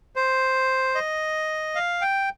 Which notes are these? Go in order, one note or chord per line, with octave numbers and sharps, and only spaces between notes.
C5
D#5
F5
G5